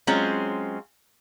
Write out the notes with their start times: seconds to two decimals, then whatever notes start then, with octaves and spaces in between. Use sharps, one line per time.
0.07 F#3 G#3 C4 C#4 F4